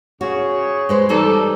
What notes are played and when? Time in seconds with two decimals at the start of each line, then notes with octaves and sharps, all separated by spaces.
0.21 C#3 F#4 G#4 C#5
0.89 G#3 B4 C5
1.09 E3 G3 D#4 A4 D5